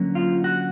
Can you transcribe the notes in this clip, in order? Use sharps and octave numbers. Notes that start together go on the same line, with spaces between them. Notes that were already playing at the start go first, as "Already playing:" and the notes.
Already playing: D3 F#3 A#3 C#4
F4
F#4